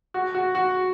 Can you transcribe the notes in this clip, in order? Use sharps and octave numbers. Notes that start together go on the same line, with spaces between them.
F#4
F#4
F#4